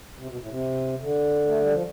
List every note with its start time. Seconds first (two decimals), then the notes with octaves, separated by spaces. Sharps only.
0.18 C3
0.28 B2
0.40 A2
0.49 C3
1.01 D3
1.47 A3
1.60 G3
1.71 F3